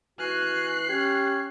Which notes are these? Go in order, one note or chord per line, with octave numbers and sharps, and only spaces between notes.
E3 F#4 G#5 F6 F#6 C7
C#4 G4 C#5